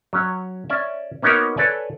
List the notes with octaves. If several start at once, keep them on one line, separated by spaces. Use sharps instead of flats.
F#3 C#4 C#5
C#4 D5 E5
A#3 B3 C#4 D#4 F#4 A#4
A4 B4 C#5 D5 G#5